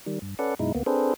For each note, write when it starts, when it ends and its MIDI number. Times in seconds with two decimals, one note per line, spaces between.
0.06 0.19 51
0.06 0.19 55
0.22 0.35 43
0.39 0.55 61
0.39 0.55 69
0.39 0.55 71
0.39 0.55 74
0.39 0.55 78
0.59 0.72 42
0.59 0.72 47
0.59 0.72 56
0.59 0.72 63
0.59 0.72 64
0.75 0.83 38
0.75 0.83 58
0.75 0.83 59
0.86 1.14 60
0.86 1.14 62
0.86 1.14 68
0.86 1.14 69
0.86 1.14 71
0.86 1.14 72